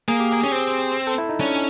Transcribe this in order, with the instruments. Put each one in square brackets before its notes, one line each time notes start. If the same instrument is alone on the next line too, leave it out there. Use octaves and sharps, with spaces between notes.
[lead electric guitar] A#3 [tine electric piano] G#4
[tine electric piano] G4
G#4
[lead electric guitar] C#4
C4
[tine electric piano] A4
E4
D#4
[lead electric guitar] C#4 [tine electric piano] D4